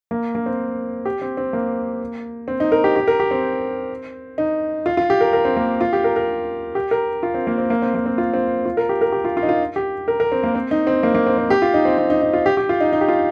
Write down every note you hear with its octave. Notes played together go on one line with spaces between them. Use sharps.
A#3
A#3
C4
G4
C4
C4
A#3
C4
D#4
A#4
G4
G4
A#4
G4
C4
D#4
F4
F4
G4
A#4
A#4
C4
A#3
F4
G4
A#4
A#4
G4
A#4
F4
C4
A#3
C4
A#3
C4
A#3
C4
F4
C4
F4
A#4
G4
A#4
G4
F4
F4
D#4
F4
G4
A#4
A#4
C4
A#3
C4
D#4
C4
A#3
A#3
C4
C4
G4
F4
D#4
C4
C4
D#4
D#4
F4
G4
G4
F4
D#4
D#4
G4
F4